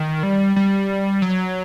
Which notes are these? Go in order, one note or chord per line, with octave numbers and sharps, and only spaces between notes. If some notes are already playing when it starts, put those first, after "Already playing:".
Already playing: D#3
G3
G3
F#3